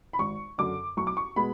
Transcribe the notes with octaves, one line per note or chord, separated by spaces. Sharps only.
B5
G#1 C#6
F#2 D3 D6
B1 C#6
D6
C#6
B2 G#3 B3 B5